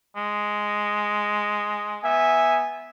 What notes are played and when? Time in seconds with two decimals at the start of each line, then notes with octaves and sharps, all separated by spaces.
0.16 G#3
2.03 B3 E5 G#5